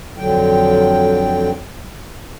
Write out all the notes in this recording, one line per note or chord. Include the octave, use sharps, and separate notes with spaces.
F2 D3 F#3 G5